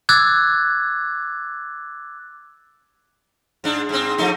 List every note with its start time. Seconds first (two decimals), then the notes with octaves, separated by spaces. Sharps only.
0.09 D6 E6 F#6 G#6 A6
3.64 G#2 D4
3.89 G#2 C4
4.18 F3 A3 D#4